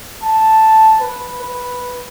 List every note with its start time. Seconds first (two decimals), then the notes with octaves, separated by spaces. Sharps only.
0.23 A5
1.01 B4
1.42 B4